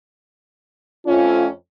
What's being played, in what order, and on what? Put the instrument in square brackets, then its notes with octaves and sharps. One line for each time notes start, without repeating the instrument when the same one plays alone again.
[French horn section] F2 A3 C#4 [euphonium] F4